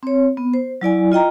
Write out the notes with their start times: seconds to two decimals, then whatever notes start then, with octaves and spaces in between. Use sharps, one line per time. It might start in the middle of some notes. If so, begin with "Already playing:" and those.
0.03 C4 C#5
0.37 B3
0.54 C5
0.81 F#3 E4 D5 G#5
1.12 F4 D#5 G5 A#5